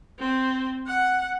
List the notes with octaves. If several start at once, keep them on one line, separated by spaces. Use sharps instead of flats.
C4
F#5